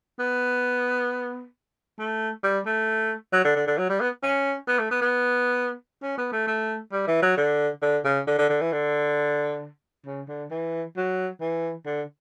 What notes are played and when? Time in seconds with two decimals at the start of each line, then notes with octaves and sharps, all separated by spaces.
0.19 B3
1.99 A3
2.43 G3
2.66 A3
3.33 F#3
3.44 D3
3.56 D3
3.67 D3
3.78 F#3
3.89 G3
4.01 B3
4.23 C#4
4.68 B3
4.79 A3
4.91 B3
5.02 B3
6.03 C#4
6.18 B3
6.32 A3
6.48 A3
6.92 G3
7.07 E3
7.22 F#3
7.37 D3
7.82 D3
8.04 C#3
8.27 D3
8.38 D3
8.50 D3
8.61 E3
8.72 D3
10.06 C#3
10.29 D3
10.51 E3
10.97 F#3
11.41 E3
11.86 D3